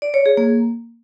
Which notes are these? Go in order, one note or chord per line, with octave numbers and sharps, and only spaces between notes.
D5
C#5
G#4
A#3